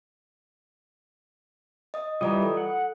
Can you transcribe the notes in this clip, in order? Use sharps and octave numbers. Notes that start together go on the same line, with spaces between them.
D#5 D#6
E3 G3 F4 D5 D#5 A#5
A4
F#5